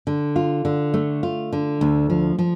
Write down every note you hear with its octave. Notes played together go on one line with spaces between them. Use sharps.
D3
F4
D3
A3
F4
D3
D2
F3
F3